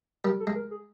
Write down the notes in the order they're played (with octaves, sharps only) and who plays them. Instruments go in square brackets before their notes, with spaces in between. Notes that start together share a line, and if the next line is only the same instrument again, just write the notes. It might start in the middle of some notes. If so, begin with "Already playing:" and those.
[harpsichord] G3 [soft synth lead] A#4
[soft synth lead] A4
[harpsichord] G#3
[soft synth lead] A#4
G#4